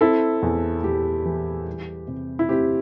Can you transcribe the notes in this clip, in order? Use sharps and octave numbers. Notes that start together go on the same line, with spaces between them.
C4 E4 A4
E2
E2 G4
E3
G3
C3
E4
C4 G4